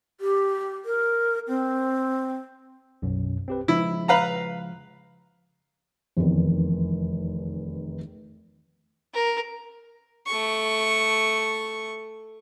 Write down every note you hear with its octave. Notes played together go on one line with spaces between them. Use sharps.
G4
A#4
C4
B1 F#2 B2
C4 G4 B4
C#3 F3 G#3 E4
B4 F5 A#5
F1 E2 D#3
A#4
A3 C#6